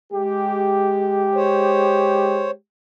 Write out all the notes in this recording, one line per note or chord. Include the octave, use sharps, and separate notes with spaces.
G#3 G4
C5 C#5